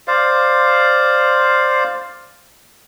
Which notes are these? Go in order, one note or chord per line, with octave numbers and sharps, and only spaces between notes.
C5 D5 F5